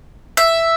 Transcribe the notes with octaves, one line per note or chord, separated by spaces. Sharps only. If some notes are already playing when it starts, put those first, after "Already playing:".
E5